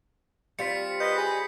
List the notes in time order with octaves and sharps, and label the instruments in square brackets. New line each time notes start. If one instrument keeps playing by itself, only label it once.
[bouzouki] G3 C4 F4 [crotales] B6 C#7
[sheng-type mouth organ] B4 D#5 [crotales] G6 B6
[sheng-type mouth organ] G#4 B5